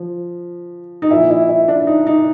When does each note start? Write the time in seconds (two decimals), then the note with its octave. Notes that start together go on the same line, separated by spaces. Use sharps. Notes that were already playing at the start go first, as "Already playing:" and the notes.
Already playing: F3
1.02 D#4
1.11 A#2 F3 E4
1.31 E4
1.49 E4
1.68 D4
1.87 D#4
2.07 D#4